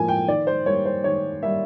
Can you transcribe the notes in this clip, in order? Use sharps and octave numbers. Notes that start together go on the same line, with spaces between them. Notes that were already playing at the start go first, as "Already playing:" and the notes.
Already playing: A2 F3 A#3 G#5
G5
D#3 D5
C5
G3 A#3 C#5
C5
D#3 C#5
G3 A#3 E5